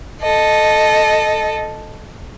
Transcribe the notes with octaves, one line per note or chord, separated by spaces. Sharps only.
A4 D#5